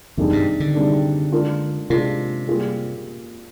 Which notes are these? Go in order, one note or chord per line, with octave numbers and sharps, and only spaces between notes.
F2 C3 D#3 G3 D4 G#4
G2
D3
C3 D#3 G3 D4 G#4
G#3 D4 F4 A#4
C3 G#3 D4 F4 A#4
G3 A#3 F4 G#4